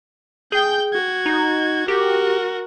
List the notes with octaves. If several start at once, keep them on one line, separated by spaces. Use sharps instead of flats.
G#4 G5 G6
F#4 G#6
D#4
F#4 G4 A#4